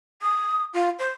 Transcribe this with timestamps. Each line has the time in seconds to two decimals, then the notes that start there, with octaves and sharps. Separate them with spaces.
0.22 D#6
0.74 F4
0.99 C5